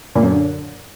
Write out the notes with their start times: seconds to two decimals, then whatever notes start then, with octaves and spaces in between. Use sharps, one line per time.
0.15 A#2
0.23 F#2
0.30 D3